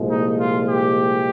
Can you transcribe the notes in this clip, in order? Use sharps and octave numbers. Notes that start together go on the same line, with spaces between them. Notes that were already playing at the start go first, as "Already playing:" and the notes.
Already playing: C2 A#2 F3 G#3
D#4
F4
G4